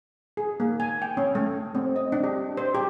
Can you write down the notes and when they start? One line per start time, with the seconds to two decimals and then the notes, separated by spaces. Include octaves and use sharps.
0.37 G#4
0.60 A#3
0.80 G#5
1.02 G5
1.17 C#4
1.35 A3
1.75 C4
1.96 D#5
2.12 D4
2.24 G4
2.57 C5
2.75 G4